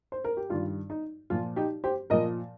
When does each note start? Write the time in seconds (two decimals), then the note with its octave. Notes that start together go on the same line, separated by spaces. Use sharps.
0.12 C5
0.24 A#4
0.37 G4
0.50 G2 D#3 G3 F4
0.90 D#4
1.30 A#2 F3 F4
1.56 D#4 G4
1.84 G4 C5
2.10 A#2 F3 A#4 D#5